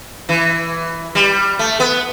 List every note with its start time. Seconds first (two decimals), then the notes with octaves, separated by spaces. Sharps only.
0.29 E3
1.15 G3
1.59 A3
1.80 B3